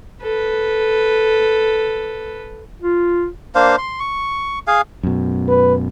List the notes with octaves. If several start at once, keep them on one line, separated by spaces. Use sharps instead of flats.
A4 B4
F4
A#3 D4 C5 F5
C6
C#6
G#4 F5 G#5
F#2 B2
B4